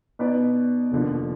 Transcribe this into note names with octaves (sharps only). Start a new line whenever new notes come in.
B2 B3 D#4 B4 D5
F1 D#2 D3 F3